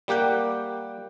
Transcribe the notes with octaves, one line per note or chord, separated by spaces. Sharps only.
G3 A#3 G4 F#5 G5